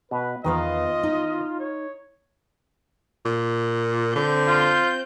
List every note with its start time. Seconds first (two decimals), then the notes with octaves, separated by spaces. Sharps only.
0.11 B2 B4
0.44 E2 D#3 B3 F4 B4 D#5 F5
1.03 D#4
1.60 C#5
3.25 A#2
4.15 D3 C4 G6
4.48 F4